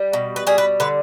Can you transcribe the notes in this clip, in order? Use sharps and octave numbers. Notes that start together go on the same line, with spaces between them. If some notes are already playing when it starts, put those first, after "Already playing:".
Already playing: G3
B2
B4
G3 G#4
B4
D3 B4